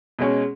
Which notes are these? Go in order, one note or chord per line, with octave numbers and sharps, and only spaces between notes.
B2 G#3 C#4